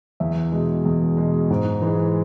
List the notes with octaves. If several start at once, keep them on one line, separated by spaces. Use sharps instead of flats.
E2 E5
B2 G#3
E2
B2 G#3
G#2
E3 G#3